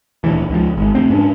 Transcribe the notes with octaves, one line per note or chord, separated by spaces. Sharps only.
D#1 D2 E3
C#2 F3
G#1
F1 G#2 A3 C4
F2 G#2 C#4 D4